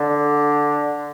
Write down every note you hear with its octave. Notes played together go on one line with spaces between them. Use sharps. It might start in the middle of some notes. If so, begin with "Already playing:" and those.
Already playing: D3